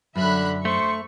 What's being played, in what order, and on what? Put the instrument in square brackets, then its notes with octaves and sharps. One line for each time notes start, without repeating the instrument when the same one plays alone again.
[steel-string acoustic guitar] F#2 [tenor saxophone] D3 [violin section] E5 B5 F#6
[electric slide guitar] A3 [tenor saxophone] C5 [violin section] C#6